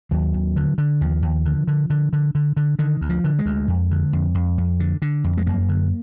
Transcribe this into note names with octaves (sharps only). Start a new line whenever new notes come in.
D#2 F#3
D#2
D3
D3
D#2 F3
D#2
D3
D3
D3
D3
D3
D3
D3 D#3
D2
F3
D3
G#3
D2
F2
D3
F2
F2
F2
D3
D3
F2
G#3
F#2 A#3
D3